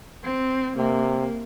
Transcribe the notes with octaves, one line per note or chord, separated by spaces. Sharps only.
C4
C3 A#3